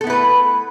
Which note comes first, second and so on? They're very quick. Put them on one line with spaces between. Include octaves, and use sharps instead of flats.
A4 B3 E4 B4 A3